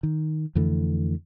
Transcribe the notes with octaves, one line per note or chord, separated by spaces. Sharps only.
D#3
F2 D3 E3 A3